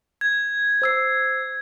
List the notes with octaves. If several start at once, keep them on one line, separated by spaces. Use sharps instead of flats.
G#6
C5 E6 C7